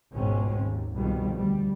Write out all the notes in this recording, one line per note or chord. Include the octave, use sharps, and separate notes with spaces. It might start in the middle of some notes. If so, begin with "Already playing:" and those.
G#1 C#2 B2 G#3 C4 C#4
D#2
C2 F2 B2 D#3 G3 G#3
D2 G3